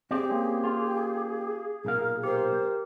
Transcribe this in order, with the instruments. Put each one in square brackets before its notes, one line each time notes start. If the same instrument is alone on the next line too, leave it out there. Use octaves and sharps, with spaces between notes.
[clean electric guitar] C4 C5 D5 [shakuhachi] G4 [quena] G#4
[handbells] A#3 C#4
[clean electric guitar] F4
[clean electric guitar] B1 A#2 F5 [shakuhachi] A#4
[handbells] G4 A#4 [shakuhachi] C5